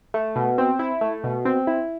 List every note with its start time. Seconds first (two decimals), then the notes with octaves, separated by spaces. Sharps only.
0.14 A3
0.36 B2
0.58 C4
0.79 E4
1.01 A3
1.24 B2
1.45 C4
1.67 E4